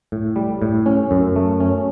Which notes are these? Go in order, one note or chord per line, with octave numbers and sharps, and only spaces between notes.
A2
G3
A2
C#4
F#2
A3
C#4